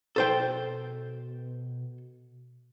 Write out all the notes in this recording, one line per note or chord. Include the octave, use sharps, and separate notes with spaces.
B2 A4 C5 G5